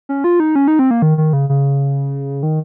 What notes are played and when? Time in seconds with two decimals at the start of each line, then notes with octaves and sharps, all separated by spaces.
0.09 C#4
0.24 F4
0.40 D#4
0.56 C#4
0.68 D#4
0.79 C4
0.91 A#3
1.02 D#3
1.18 D#3
1.33 C#3
1.49 C#3
2.43 D#3